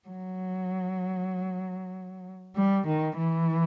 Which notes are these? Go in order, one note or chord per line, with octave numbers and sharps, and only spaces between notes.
F#3
G3
D#3
E3